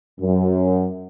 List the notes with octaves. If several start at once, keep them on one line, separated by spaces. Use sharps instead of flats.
F#2